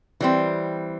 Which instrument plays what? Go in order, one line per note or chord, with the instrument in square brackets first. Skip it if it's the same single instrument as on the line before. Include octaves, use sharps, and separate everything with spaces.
[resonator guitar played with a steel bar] E3 G3 C4